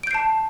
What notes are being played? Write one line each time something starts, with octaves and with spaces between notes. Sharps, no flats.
A5 G6 C7 D7